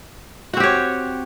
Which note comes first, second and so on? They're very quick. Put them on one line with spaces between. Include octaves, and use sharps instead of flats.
F#4 C4 G4 C#5